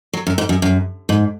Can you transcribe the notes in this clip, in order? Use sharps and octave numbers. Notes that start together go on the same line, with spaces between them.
F#3
F#2
G#2
F#2
F#2
G#2